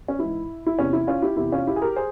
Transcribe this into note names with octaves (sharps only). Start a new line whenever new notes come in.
C#4
G#2 E3 E4
E4
E2 C3 E3 C#4
E4
C#4 F4
E4 G4
E2 C3 E3 E4 G4
C#4 F4
E4 G4
G#4
G4 A#4
G#4 C5